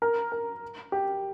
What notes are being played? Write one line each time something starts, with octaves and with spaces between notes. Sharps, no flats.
A#4
A#4
G4